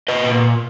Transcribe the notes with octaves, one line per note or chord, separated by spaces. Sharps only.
B4 D#5
A#2